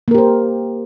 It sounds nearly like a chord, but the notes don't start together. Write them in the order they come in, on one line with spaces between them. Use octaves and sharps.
A#3 A#4 G4 C5